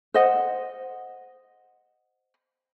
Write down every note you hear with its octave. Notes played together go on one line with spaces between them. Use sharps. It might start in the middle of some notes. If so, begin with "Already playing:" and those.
C5 D#5 F#5